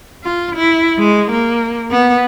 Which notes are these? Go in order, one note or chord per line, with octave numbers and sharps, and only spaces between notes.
F4
E4
G#3
A#3
B3